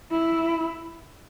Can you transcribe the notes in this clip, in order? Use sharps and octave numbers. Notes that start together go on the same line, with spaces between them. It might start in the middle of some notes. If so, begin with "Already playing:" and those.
E4